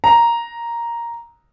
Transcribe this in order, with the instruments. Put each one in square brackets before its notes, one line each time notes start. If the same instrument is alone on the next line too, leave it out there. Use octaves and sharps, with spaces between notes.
[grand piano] A#5